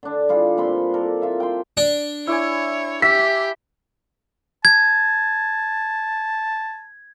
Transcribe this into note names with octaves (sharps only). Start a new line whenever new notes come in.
D3 D4
G3 F4 G#4
A#2 C4 B5 C6
A4 A#4
F4 E5
G5 C6
D4
E4 C#5 D5 G#5
G4 E5 B6
A5 G#6